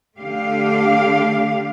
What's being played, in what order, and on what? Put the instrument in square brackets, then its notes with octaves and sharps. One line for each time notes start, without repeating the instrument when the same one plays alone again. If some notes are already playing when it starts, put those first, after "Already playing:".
[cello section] D3 A3 G4 F5